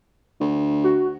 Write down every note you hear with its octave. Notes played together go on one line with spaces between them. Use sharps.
D2
F#4